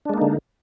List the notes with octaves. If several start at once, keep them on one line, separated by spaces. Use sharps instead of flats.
D3 G#3 A#3 D4 D#4